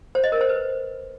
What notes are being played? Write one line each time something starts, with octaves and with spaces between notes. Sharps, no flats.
C5
D#5
A#4
C5
B4